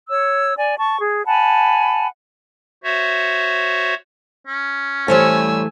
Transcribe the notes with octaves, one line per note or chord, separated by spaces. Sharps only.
C#5 E6
D5 G#5
A5 C#6
G#4
F#5 G#5 A5 B5
F#4 C5 C#5 E5
C#4
E3 G3 A3 A4 C5 C#5 G#5 E6